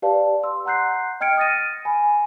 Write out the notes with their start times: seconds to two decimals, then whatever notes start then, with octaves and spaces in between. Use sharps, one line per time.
0.02 G4 B4 D5 F5 A5
0.43 C6 E6
0.65 F#5 A#5 C6 F#6 G6 C7
1.20 D#5 G5 F6 G#6 C#7 D7
1.37 D#6 F6 A6 A#6 D#7
1.85 G#5 B5